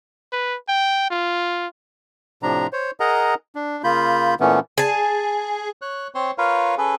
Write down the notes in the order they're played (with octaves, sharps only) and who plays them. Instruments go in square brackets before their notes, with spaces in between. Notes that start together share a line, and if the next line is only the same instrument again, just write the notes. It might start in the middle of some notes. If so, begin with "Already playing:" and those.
[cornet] B4
G5
F4
[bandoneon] A2 C3 F3 D4 A#5
C5 C#5
G#4 A#4 D#5 F#5 A#5
D4
C#3 A#3 F4 B5 G6
A#2 E3 A3 B3 C#4
[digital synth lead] G#4 [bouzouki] G#5 A5
[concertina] C#5 F#6
C4 C5 C#5 C6
F4 A#4 B4 C#5 F5
C#4 G#4 A4 B4